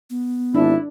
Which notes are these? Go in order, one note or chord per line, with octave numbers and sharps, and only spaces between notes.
B3
G#1 D4 E4